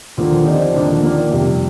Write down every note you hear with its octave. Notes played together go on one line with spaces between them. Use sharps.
D#2 D3 F3 A#3 F4
F3 C4 D#4 G4 D5
D#2 D3 F3 A#3 D4
D#3 A#3 F4 A#4 D5
F2 C3 G3